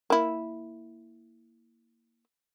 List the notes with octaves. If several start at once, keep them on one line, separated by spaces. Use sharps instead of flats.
A#3 E4